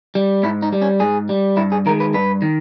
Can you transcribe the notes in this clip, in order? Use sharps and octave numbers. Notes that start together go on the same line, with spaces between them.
G3
G#2 E4
D#4
G3
C#4
G#2 G#4
G3
G2 E4
G#4
D#3 G#3 A#4
B4
G2 B4
D#3